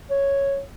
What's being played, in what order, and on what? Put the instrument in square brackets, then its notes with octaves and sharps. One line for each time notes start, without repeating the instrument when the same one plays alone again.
[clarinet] C#5